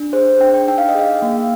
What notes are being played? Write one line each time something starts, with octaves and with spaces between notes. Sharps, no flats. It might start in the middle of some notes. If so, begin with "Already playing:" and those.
Already playing: D4
G#4 C5
D4 G5
G5
D#4 G5
F5
D#5
G#4 F5
A#3